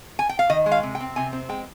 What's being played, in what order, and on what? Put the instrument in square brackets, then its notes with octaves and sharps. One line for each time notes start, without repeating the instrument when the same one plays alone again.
[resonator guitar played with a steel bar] G#5
G5
F5
D#3 D#5
G#3
F5
C3
G5
C4
C3 G#5
C4
G#3 G5